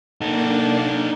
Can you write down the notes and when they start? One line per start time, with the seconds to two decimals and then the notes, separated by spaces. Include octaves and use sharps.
0.21 A#3 D4 D#4 A4